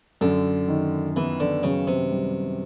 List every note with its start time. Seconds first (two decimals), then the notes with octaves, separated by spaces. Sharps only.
0.21 F#2 D3
0.68 D#3
1.16 E3 B3
1.40 D3
1.63 F#2 C#3
1.87 C3
2.11 G3